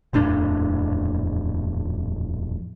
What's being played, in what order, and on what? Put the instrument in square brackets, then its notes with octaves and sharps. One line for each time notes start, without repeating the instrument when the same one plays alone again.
[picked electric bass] D#1 F2 A2 D4